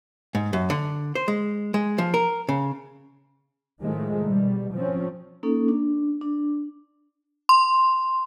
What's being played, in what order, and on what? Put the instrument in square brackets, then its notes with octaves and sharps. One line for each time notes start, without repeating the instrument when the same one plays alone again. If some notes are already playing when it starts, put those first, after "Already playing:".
[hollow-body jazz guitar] G#2
F#2
D3
C5
G#3
G#3
F3
A#4
C#3
[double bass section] A2 D#3 F3 G#3 A3
B2 G3
F3 C4 C#4
[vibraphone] A#3 C#4 D#4 A4
D4
D4
[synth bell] C6